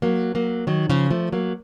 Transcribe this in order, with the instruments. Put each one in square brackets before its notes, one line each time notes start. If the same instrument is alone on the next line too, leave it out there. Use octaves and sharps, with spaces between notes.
[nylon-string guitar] F#3 A#3
F#3 A#3
D#3 F#3
C#3 F3
F3 A3
F#3 A#3